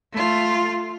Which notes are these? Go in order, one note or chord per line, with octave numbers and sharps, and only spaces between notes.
A3 F4